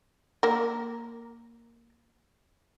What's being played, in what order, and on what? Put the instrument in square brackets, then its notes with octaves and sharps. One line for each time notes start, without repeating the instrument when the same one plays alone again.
[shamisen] A#3 A#4